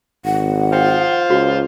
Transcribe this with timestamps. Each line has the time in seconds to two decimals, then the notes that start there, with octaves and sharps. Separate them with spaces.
0.25 G#1 F#5
0.73 F4 C5 G5
1.30 C#2 F#4